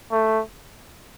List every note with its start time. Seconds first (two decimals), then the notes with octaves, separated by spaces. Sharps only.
0.12 A3